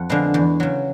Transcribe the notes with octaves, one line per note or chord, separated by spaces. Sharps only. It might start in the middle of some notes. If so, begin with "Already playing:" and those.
Already playing: F2 F#5
D3 F3 G#3 B3
E2
C#3 F#3